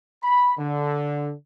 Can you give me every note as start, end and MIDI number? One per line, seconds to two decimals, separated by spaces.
0.23 0.52 83
0.58 1.33 50